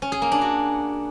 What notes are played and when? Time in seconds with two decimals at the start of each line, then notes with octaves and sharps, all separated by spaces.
0.02 C#4
0.12 G#4
0.22 A#3
0.32 D4
0.41 F#4